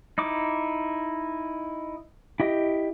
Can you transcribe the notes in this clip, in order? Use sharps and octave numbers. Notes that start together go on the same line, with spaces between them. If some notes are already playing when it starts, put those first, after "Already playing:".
D#4 E4 D6
E4 G4 D#5